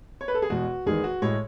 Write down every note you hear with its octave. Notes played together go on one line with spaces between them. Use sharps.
C#5
B4
A4
G#4
E2 B2 G#3 F#4
E2 D#3 G#3 G#4
F#4
A2 G#3 C#5